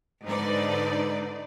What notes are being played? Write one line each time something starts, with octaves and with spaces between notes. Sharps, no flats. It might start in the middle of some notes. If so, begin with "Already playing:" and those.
G#2 D3 D#4 B4 D5